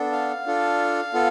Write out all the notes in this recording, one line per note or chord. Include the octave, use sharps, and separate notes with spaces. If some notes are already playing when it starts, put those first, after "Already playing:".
Already playing: B3 D4 A4
F5
D4 F4 A4
B3 F4 A4